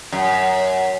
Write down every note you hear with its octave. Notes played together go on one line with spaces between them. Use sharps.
F#2